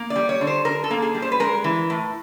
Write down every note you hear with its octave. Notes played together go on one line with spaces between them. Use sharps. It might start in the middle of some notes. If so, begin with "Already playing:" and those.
Already playing: A#3
D5
G3
C#5
D3
C5
D3 A#4
A4
A#3
G#4
G3
C5
B4
G#3 A#4
E3
A2